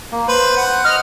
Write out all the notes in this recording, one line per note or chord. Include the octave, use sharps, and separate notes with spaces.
A#3
B4 C5
F#5
D#5 F6